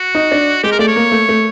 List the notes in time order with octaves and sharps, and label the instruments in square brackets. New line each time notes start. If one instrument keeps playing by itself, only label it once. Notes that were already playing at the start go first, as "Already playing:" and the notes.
Already playing: [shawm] F#4
[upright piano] D#4
D4
[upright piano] G#3 [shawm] G4
[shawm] A#4
[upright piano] A3 [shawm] D5
[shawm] C#5
[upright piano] A#3
A3
A3